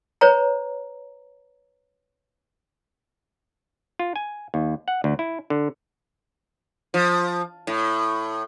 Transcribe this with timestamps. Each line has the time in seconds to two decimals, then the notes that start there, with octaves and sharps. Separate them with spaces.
0.21 B4 C#5 A#5
3.99 F4
4.16 G#5
4.54 D#2
4.88 F#5
5.04 D2
5.19 E4
5.50 D3
6.94 F3
7.67 A2